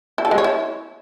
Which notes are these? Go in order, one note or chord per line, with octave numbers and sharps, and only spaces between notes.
E4
A4
G#3
C#5
E4